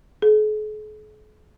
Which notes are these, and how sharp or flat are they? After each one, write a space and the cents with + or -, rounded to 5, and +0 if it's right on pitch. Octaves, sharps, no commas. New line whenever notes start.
G#4 +45